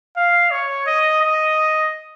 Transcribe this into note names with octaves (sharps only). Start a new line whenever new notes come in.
F5
C#5
D#5
D#5